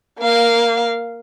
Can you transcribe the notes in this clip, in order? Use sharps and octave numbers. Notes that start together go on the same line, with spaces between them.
A#3 F5